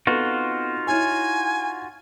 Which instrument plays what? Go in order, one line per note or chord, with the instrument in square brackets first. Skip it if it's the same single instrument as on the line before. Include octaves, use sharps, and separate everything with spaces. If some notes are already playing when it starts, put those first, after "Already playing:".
[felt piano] B3 C4 A4 [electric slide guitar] D#4 F4 F#4
[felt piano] E4 C#5 F6 [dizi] G#5